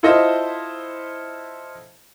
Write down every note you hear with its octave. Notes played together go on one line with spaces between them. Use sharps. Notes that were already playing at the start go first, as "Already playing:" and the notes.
E4 F4 A4 C5 D#5 E5